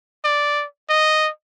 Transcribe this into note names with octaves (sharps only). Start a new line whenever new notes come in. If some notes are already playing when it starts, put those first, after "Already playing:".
D5
D#5